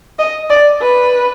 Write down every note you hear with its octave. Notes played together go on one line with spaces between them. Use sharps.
D#5
D5
B4